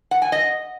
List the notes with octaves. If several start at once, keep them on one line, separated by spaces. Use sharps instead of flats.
F#5
G#5
D#5